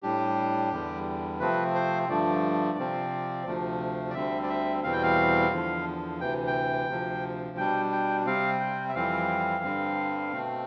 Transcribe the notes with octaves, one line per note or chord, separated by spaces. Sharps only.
A2 G3 D4 G4
E2 D3 G3
C3 F3 A3 C4 B4
C5
G2 D3 F3 A3 D5
C3 F3 C4
D2 C3 F3 A3
D5
D2 D3 G3 C4 E5
D5
E5
E2 B2 G3 C4 F5
G5
F5
E2 D3 F3
D2 C3 E3 G5
G5
D2 C3 F3
B2 G3 D4 G5
G5
C3 G3 C4 F5
G5
E5
F2 E3 G3 C4 F5
G2 D3 G3 C4
B2 A3 C4